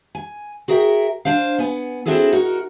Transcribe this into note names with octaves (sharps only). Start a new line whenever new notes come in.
G#5
F#4 G#4 A#4 D5 E5 G5
D4 C5 F5
B3 F#5 G#5
C4 D4 E4 F#4 G#4 A4
D#4 F#4 A#4